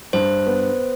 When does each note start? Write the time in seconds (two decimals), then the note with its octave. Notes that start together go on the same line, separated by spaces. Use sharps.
0.13 G2 C5
0.47 B3